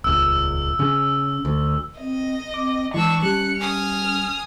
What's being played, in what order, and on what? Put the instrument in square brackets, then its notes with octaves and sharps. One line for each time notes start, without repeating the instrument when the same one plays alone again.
[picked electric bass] D#1 C#2 [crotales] E6
[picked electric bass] C#3 C#4
D2
[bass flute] C4 [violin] D#5
[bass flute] C4 [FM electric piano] D6
[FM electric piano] E3 [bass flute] G#3 [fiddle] D4 [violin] C#6 E6
[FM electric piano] G3 [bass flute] C#4 [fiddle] F#6 [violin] C#7
[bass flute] C#4 [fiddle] G#5 D#6 [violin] F6